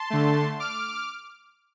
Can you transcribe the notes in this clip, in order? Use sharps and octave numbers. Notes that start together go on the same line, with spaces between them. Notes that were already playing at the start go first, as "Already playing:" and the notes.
Already playing: A5 C6
D3 A3
D6 F6